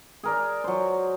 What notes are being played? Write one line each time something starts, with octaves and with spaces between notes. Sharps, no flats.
G#4 A#4 D5
F#3 C5